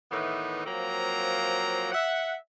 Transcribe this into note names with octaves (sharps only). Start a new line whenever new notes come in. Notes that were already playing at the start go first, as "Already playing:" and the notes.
A2 D#3 E3 B3 D#4
F3 F#3 A#3 C4 A#5
E5 F#5